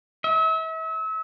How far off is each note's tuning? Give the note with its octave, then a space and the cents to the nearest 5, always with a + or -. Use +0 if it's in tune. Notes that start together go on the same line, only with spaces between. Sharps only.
E5 -35